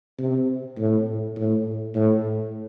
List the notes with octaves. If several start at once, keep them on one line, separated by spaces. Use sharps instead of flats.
C3
A2
A2
A2